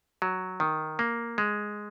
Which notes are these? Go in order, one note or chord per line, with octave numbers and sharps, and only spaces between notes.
F#3
D#3
A#3
G#3